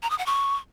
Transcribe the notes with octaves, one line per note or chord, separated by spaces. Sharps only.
A#5
D#6
F#5
C#6